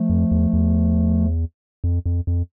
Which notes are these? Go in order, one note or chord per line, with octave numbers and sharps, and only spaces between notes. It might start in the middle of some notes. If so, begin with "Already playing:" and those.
Already playing: F3 A3
F2
E2
E2
F2
F2
F2